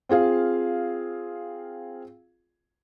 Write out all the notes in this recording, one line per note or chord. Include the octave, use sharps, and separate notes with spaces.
C4 F4 G#4 F5